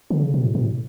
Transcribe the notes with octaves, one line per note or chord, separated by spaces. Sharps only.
D3
C#3
B2
A2
B2
A2